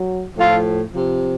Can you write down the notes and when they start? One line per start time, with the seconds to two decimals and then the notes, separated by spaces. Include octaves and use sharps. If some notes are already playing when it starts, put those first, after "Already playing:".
Already playing: F#3
0.36 A2 F3 F4 A4
0.93 C3 F3